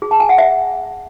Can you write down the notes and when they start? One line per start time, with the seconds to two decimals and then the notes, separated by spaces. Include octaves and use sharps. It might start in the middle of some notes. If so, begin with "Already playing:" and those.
0.02 G#4
0.11 A5
0.20 G#5
0.29 F#5
0.38 E5